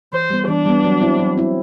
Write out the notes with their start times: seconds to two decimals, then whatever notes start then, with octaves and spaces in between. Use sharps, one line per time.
0.13 E3 C5
0.30 G3 B3
0.48 E3 D4
0.66 G3 B3
0.84 F#3
1.02 C4 E4
1.19 F#3
1.37 C4 E4